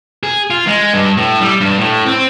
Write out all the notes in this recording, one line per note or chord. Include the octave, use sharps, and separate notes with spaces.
G#4
F4
G#3
G2
A2
G3
G2
A2
C4